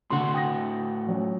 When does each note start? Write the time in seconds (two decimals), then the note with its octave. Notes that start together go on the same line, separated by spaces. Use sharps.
0.10 A2 D3 F#4 F#5 C6
0.34 G5 D#6 A#6
1.07 F3 F#3 C#4